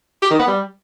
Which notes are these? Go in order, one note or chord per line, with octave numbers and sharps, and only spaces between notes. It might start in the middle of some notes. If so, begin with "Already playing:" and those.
G4
D#3
B3
G3